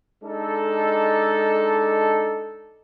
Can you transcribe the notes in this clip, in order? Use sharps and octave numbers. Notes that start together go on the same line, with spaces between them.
G#3 D4 D#4 A4